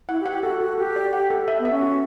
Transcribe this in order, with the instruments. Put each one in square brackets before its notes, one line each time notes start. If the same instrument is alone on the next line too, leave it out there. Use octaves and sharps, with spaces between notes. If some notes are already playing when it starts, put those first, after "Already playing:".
[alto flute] E4 [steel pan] F#5
[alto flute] G4
[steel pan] F#5
[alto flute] G4
[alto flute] F#4 [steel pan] A4
[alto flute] F#4 [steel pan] A4
[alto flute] G4 [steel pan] A4
[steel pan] D5
F#5
A4
E5
[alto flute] B3
[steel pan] E5
[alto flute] C#4
[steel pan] F#4